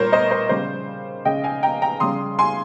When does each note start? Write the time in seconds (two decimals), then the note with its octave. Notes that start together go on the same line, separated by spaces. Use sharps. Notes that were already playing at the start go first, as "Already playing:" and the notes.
Already playing: A#2 G3 A#4 C5 C#5
0.12 C5 D#5
0.31 C5
0.49 C#3 G3 C5
1.25 C#3 G#3 D#5 G5
1.44 F5 G#5
1.63 G5 A#5
1.82 G5 A#5
2.00 C#3 G3 C6 D#6
2.39 G#5 C6